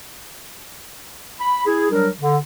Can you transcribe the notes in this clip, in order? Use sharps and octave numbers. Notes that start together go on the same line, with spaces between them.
B5
E4 G#4
F#3 G3 D4 A#4
D3